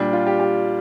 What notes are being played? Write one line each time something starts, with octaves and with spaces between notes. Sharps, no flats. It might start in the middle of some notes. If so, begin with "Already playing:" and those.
Already playing: A#2 G3 D4
F4
G4
G4